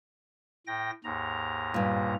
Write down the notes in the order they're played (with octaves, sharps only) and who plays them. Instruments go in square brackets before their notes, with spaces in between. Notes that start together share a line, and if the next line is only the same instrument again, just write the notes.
[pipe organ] A2 G5 A#6
D#2 G#2 A#5
[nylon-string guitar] G2 A#2